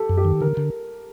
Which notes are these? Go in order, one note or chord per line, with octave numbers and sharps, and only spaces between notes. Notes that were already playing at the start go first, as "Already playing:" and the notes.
Already playing: G4 A4
F#2
G4
D#3
D3 A#4
D3